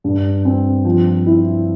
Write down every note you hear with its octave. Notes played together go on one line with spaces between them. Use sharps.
G2
C4
F3
E4